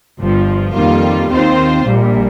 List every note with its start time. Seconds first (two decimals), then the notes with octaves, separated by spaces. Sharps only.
0.18 G1 G2 F3
0.73 F2 D#3 G3 A#3 F4
1.29 D#2 D#3 C4 F4 C5
1.84 A#1 A#2 G3